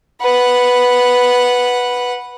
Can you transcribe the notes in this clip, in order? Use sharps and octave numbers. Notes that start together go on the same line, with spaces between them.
B4 F#5